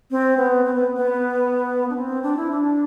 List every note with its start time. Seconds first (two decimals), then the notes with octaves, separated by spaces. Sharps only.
0.11 C4
0.37 B3
0.65 C4
0.74 B3
0.96 B3
1.90 D4
1.96 C4
2.23 D4
2.37 E4
2.50 D4